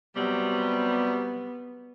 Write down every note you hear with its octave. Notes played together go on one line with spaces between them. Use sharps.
C3 F#3 G3 B3